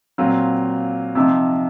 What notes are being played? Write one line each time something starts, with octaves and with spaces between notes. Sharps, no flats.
A#2 F#3 C4 F4
C3 F3 C4 D#4